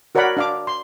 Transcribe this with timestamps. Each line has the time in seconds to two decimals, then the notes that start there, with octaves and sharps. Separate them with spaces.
0.15 F#4 A#4 C#5 D5 F#5 B5
0.37 D4 F5 D6
0.67 C6